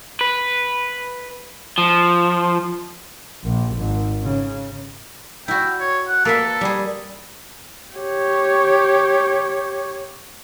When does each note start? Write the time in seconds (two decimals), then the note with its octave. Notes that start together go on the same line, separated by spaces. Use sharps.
0.21 B4
1.78 F3
3.44 A#1
3.75 G#1
4.23 C#3
5.48 E4 F#4 G5
5.80 C#5
6.08 F#5
6.25 A#3 A4 B4 E5
6.61 G3 G#4
7.95 G4 C#5